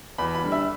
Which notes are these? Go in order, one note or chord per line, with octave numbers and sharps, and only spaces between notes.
E2 B5
B5
D3 G3
E5